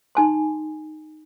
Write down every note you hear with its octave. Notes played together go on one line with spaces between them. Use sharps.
D#4 G#5 C6